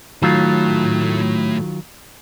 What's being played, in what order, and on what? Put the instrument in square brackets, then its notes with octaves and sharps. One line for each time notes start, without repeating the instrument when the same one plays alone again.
[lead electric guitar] A2 A3 [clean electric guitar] D#3 F#3 F4